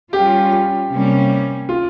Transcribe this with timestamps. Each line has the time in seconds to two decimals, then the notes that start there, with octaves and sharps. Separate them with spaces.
0.12 G3 C#4 F4 G4
0.52 G4
0.91 C3 G3 A#3 C#4
1.69 F4